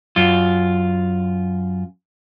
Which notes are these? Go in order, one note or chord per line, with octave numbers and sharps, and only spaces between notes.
F#2 F4